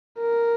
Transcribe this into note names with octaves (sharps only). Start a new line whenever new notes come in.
A#4